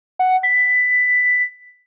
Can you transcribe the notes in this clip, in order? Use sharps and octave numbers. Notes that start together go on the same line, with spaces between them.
F#5
B6